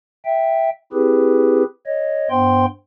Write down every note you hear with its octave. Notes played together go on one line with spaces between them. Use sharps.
E5 G5
C4 E4 G4 G#4 B4
C#5 D#5
G2 B3 C5 G5 C6